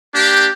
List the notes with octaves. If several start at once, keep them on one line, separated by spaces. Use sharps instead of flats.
A#3 D4 G4